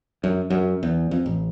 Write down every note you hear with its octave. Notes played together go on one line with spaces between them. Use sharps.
F#2
F#2
E2
F2
A1